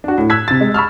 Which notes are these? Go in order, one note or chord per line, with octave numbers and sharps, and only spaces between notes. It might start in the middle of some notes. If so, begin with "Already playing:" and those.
D4 F#4
A2
E6 F#6 G#6 B6
C3 A6
G#3
B5 C#6 E6 F6